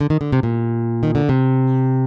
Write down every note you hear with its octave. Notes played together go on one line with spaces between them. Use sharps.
D3
D#3
D3
C3
A#2
D#3
D3
C3